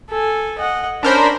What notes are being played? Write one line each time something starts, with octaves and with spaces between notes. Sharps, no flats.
A4 G#5
D#5 F#5
C#4 D4 A#4 C5 B5